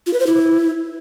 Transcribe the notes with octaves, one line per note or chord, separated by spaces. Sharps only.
F4
B4
C5
E4